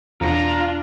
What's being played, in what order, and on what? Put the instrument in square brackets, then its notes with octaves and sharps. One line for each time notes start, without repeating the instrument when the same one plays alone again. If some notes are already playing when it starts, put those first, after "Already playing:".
[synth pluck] E2 B2 [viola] D4 [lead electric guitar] F4 [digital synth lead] A#5